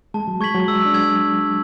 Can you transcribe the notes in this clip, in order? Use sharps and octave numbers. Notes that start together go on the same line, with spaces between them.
G#3 A5
F#3
G#3 C#6 G#6 B6 F#7
F#3
G#3 E6
D4
G#6